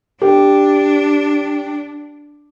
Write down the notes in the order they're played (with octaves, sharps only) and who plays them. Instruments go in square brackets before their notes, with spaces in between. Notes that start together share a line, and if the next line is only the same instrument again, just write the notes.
[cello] D4 [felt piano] G4